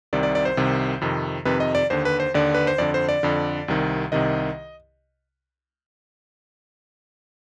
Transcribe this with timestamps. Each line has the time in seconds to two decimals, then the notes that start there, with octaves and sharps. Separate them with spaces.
0.13 C2 C3 D#3 D5
0.23 D5
0.35 D5
0.45 C5
0.57 C2 C3 D#3
1.01 F2 C3 D#3
1.45 F2 C3 D#3 B4
1.60 D#5
1.75 D5
1.90 D#2 D3 C5
2.05 B4
2.20 C5
2.34 D#2 D3 D5
2.54 B4
2.67 C5
2.78 F2 D3 D5
2.94 C5
3.09 D5
3.23 F2 D3
3.68 C2 C3 D#3
4.12 C2 C3 D#3 D#5